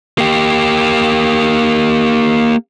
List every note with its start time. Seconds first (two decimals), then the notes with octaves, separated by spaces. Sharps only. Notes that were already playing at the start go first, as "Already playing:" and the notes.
0.18 A#3 G4